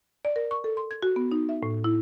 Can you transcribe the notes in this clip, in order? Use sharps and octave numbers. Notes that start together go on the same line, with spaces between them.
D5
A#4
C#6
A4
C6
G#6
F#4
B3
D#4
E5
A2
E4